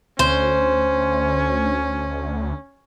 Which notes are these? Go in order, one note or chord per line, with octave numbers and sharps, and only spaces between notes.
D2 C#4 C5